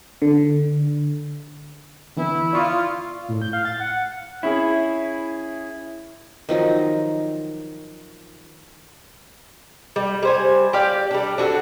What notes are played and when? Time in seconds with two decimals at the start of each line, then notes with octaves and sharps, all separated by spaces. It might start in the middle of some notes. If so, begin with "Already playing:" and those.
0.22 D3
2.17 D3 E3 B3 E4
2.53 F4 D5 C#6 D#6
3.29 A2
3.42 G6
3.53 F5
3.65 A6
3.80 F#5
4.43 C#4 E4 G#4
6.49 D#3 F3 F#3 D#4
9.96 G3
10.23 G3 C5 G#5
10.73 G4 D5 F5
11.11 G3 D4
11.38 D4 F#4 G#4 A4